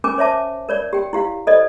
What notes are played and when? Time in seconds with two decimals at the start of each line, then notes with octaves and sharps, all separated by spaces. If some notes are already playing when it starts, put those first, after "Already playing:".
0.04 C#4 A#4 G#5 D6
0.18 C5 C#5 E5 A5 D6
0.69 A#4 C#5 D5
0.93 G4 G5
1.13 E4 G4 F5
1.47 A4 C5 D5 D#5